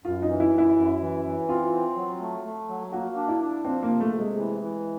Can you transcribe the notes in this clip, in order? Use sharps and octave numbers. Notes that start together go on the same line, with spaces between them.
F#2 F4
D#4
E3
E4
F#2
E4
F#2
E3
E3
C4 F4
C4
F#3
A3
A3
F#3
A#3 F#4
D4
E4
D4
F3 C4
A#3
C3
A3
C3
G#3
E3
E3